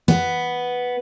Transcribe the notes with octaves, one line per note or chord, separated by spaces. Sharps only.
B3